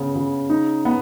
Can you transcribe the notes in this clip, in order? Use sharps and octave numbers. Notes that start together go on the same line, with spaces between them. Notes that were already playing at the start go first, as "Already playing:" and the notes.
Already playing: C#3 B3
C#3
D#4
B3